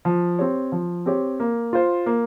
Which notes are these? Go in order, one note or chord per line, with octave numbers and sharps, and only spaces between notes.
F3
C4 G4 C#5
F3
C4 G4 C#5
A#3
F4 C5
A#3